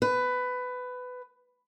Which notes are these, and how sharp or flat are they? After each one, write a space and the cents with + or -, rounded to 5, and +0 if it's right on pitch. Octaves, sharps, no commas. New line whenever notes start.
B4 +15